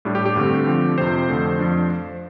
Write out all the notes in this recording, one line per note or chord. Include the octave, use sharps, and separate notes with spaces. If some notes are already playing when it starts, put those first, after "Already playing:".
A2 G3 D4
G4
G4
G2 D3 A3 C4
D3 F3 C4
F2 C3 F3 C4 C5
F2 D3 A3
F2 F3 D4